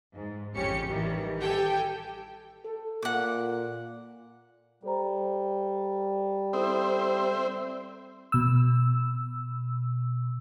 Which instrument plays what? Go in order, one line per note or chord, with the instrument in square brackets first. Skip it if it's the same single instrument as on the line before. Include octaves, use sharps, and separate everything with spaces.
[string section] G#2
A1 F2 C#3 C#4 G4 C#7
A1 D#3 E3 G3
G4 A4 G5 G#5
[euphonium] A4
[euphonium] A#2 [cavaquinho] F#5 D6
[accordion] G3 [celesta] A4 C5 A#5
[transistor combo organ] C4 C5 E5 [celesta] E4 A4 D#6
[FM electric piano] B2 E6